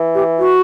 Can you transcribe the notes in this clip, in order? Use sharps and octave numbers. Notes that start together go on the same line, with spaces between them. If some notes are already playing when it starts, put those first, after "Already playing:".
Already playing: E3
G4
F#4